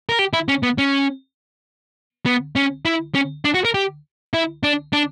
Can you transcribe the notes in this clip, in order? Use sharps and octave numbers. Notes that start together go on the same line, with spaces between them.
A#4
G4
E4
C#4
B3
C#4
B3
C#4
E4
C#4
D4
F#4
A#4
G4
E4
D4
D4